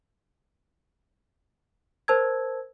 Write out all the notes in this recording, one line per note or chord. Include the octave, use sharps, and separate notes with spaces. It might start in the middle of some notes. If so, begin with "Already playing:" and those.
A#4 C5 A5 E6 G#6